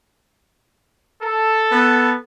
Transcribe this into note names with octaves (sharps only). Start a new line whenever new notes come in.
A4
B3